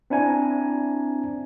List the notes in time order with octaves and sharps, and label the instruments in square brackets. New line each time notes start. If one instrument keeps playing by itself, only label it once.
[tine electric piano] C4 D4 E4 G#5 A#5